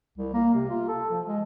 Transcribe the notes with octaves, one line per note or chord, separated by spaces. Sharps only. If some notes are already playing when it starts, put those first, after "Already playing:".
C2
A#3
C3
F4
A4
F3
G#3